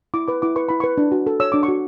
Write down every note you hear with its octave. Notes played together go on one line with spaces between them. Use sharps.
E4 D6
B4 D6
E4 D6
B4 C#6
E4 B5
B4 C#6
D4
F#4
A4
C#5 E6
D4 D6
C#6
F#4